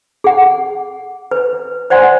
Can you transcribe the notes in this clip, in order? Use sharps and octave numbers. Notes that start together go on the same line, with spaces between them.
G#4 F#5
B4
C5 D5 F#5 G#5 C6